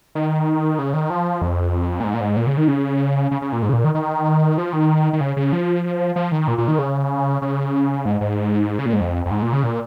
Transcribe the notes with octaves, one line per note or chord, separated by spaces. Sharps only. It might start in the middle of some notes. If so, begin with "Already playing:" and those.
D#3
C#3
D#3
F3
F2
A#2
G#2
A#2
G#2
A#2
C#3
D#3
C#3
C#3
C#3
A#2
G#2
C#3
A#2
D#3
D#3
F3
D#3
D#3
C#3
C#3
F3
F3
D#3
A#2
A#2
D#3
C#3
C#3
G#2
G#2
C#3
A#2
G#2
F2
F2
G#2
A#2
C#3
A#2